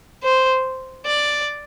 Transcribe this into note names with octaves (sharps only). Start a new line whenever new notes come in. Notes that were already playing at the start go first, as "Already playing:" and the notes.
C5
D5